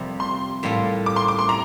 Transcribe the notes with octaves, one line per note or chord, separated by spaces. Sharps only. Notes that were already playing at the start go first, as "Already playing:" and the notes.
Already playing: F2 C3 G3 A#3
C6
A2 G3 A#3 F4 A4
D6
C6
D6
C6
C3 A#5